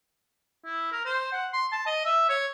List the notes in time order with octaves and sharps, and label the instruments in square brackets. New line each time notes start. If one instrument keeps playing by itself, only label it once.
[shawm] E4
A#4
C5
F#5
C6
A5
D#5
E5
C#5